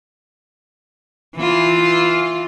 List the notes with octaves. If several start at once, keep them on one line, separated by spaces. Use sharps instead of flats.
E3 F4